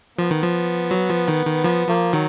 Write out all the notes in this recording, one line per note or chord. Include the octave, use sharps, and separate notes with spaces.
F3 B3
D#3
F3
F#3
F3
D#3
D#3
F3 B3
F3 A#3
D#3 F#3